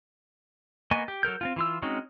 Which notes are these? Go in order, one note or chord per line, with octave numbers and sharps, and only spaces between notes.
A#3 B3 D#5 G#5 C#6
G4
F#3 A4 A#4 G6
C4 C#4 F4
E3 F4 E6
G#3 C4 C#4 D#4 F#4